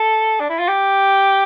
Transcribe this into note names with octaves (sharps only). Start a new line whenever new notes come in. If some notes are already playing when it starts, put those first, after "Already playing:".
Already playing: A4
D4
E4
F4
G4